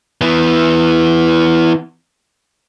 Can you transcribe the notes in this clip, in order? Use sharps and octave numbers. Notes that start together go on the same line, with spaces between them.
E3 B3